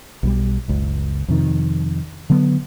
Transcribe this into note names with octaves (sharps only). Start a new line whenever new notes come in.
B1 F#3 G3
F#1 C#2
F2 C3 D#3
D3 F#3 B3